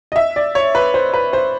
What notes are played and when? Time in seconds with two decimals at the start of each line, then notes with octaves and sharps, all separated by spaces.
0.12 D#5
0.16 E5
0.36 D5
0.55 C#5
0.75 B4
0.94 C5
1.14 B4
1.33 C5